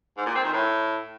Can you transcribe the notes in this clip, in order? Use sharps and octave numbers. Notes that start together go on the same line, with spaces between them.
G#2
A#2
C4
D#3
A2